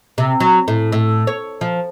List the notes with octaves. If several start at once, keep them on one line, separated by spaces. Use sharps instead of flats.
C3
F#3
A2
A2
C#5
F3